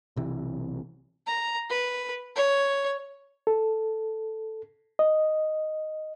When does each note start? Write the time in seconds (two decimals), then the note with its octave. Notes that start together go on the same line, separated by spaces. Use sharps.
0.16 B1 C3 E3
1.27 A#5
1.70 B4
2.35 C#5
3.47 A4
4.99 D#5